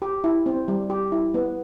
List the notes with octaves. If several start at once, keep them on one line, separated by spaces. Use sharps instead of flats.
G4
E4
C4
G3
G4
E4
B3